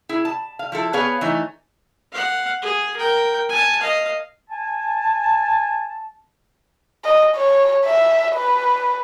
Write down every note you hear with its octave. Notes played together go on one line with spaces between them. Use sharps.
E4 G#4
A5
F5
F3 E4 A4
B3 G#4 B4 C#5 F5
E3 A3 D#4 C#5
F5 F#5
G#4
A#4 G5
G#5 A5
D#5 F5
G#5 A5
D#5
C#5
E5
B4